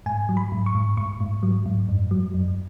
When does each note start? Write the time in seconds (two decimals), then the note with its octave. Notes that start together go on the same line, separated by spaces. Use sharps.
0.06 G#2 G#5
0.29 F#3
0.37 B5
0.52 G#2
0.66 C#6
0.75 G#2
0.97 G#2 C#6
1.21 G#2
1.43 F#3
1.66 G#2
1.89 F#2
2.11 F#3
2.34 F#2